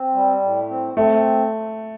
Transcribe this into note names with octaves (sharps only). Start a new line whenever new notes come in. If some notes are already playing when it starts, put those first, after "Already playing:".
Already playing: C4
G3
A2
C4
A3 C4